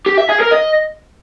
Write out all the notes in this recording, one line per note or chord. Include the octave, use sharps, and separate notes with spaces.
G4
E5
G#4
A#4
D#5